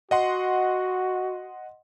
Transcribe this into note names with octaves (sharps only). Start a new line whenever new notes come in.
F#4 D#5 F#5 C6